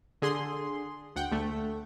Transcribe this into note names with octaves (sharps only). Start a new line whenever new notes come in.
D3 G#4 C6
D2 F#5 G5
D2 A3